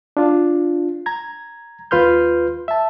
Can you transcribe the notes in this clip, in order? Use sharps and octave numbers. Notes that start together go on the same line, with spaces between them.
D4 F4
A#5 G#6
D#2 F4 B4 C6 F6 G6
E5 A5